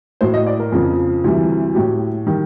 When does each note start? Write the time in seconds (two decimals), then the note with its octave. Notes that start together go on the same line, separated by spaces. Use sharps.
0.21 A2 F#3 C5
0.34 D#5
0.47 D5
0.59 A#4
0.72 F2 C#3 F3
1.24 D2 C3 E3 G3
1.75 A2 F#3 G4
2.27 D#3 G3